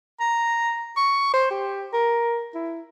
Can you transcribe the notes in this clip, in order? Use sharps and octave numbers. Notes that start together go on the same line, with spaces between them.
A#5
C#6
C5
G4
A#4
E4